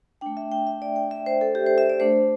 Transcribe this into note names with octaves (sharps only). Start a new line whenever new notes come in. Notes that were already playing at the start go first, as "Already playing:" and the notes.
A3 D4 G5
E5
G5
E5
D5
G5
E5
C5
A4
G4
C5
E5
D5
A3 D4 C5